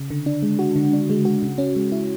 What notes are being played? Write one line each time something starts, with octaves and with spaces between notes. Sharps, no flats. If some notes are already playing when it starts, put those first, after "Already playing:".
Already playing: C#3
D3
D4
G#3
F#4
D3
D4
G#3
F#4
C#3
C#4
G#3
E4